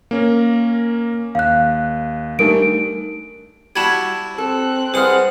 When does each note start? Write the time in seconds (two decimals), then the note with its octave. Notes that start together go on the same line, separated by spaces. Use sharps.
0.11 A#3 C#4 A#4
1.35 D#2 F5 F#6
2.39 G3 A3 D4 D#4 A#4 D7
3.76 G3 E4 F#4 A5 B5 G#6
4.38 C4 A4 F#6
4.94 C2 G#3 B3 G#4 C5 F#5 F6